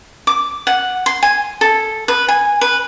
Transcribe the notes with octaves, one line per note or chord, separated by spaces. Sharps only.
D6
F#5
C6
G#5
A4
B4
G#5
B4